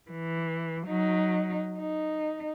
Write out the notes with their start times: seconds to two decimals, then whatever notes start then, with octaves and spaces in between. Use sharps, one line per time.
0.11 E3
0.87 F#3 D#4
1.78 D#4